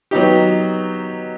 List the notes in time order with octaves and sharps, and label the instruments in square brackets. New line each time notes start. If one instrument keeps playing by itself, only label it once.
[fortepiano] F#3 B3 D#4 G4